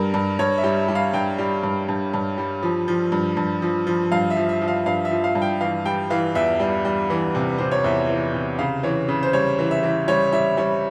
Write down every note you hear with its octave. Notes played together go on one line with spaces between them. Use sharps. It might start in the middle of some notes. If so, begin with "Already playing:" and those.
Already playing: G2 G3 A#4
G2
G2 C#5
E5
G3
E5
G3
F5
G2 G5
G3
G2
G2
G2
G3
F3
F3
G2
G2
F3
F3
G2 F5
E5
F3
E5
F3
F5
G2 F5
E5
F3
F5
G2
G5
E3 F5
G3 G5
E3 F5
E2 E5
G3
G3
E3
C3
C3 C5
C#5
E2 E5
E3
C3
C#3 F5
E3 C#5
C#3
C5
G3 C#5
E3
E5
E3
G3 C#5
G3 E5
G3 C#5